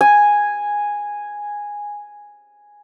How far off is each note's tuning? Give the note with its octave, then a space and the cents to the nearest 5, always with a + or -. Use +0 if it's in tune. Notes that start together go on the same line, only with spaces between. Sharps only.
G#5 -5